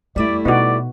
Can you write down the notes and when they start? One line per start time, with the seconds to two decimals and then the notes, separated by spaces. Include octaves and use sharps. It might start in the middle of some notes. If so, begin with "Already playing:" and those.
0.16 F2 G3 A3 E4 D5
0.45 B2 B3 D#4 F#4 D5